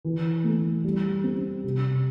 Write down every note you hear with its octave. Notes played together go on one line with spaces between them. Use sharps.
E3
A3
G3
C4
C3